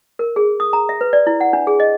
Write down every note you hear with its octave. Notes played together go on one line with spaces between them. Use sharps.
A#4
G#4
D#6
A#5
E5
B4
D5
E4
F#5
D4
G#4
D#5